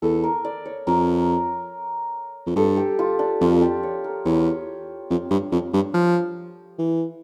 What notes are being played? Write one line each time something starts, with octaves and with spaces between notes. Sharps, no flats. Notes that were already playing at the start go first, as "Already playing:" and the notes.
E2 A4
A#4
D5
C#5
F2 A#4
F2
G2 A4
G4
F4
D4
F2 F4
G4
C#5
A#4
E2 C#5
F2
G2
F2
G2
F3
E3